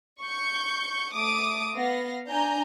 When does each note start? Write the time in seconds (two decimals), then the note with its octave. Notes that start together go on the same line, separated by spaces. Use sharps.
0.22 C#6 G6
1.13 A3 D6 D#6 D7
1.74 B3 F5 A#6
2.27 D4 G#5 A#5 G6